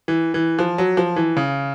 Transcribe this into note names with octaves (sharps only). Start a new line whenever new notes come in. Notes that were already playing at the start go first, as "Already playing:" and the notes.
E3
E3
F3
F#3
F3
E3
C#3